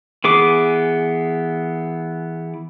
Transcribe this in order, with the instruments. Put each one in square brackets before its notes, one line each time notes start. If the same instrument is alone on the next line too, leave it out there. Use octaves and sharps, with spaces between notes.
[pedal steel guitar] E3 B3 G#4 D6